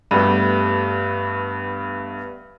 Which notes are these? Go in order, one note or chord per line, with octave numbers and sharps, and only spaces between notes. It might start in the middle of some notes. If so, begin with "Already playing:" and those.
G2 G3 A3 B3